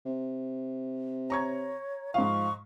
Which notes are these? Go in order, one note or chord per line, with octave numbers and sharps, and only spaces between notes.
C3
C#5 A#5 C#6 G#6
G#2 F3 F5 C#6